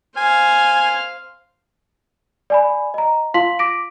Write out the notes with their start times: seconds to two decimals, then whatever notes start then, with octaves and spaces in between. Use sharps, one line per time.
0.17 C5 F5 G#5
2.50 D5 G#5 B5
2.94 D#5 A#5
3.34 F4 F5 A5 C6 B6 F#7
3.59 D6 A#6 B6 D7